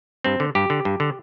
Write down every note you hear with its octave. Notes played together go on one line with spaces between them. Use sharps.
G2 C4
D3
G2 G4
D3
G2
D3